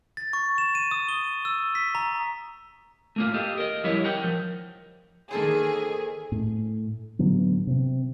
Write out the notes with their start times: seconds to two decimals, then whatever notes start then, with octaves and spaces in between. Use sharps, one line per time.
0.17 A6
0.33 C#6
0.58 E7
0.75 D#7
0.91 D#6
1.08 G7
1.45 E6
1.75 B6
1.95 A#5
3.16 A3 A#3 F4
3.34 G4 A4 D#5 F5
3.58 A#4 D#5
3.84 F3 G3 E4 G4 C#5 D#5
4.04 A#4 F#5 G5
4.24 F3
5.31 D#3 A#3 G#4 A4 C5
6.32 A2
7.19 A2 D3 F#3 B3
7.67 C3 C4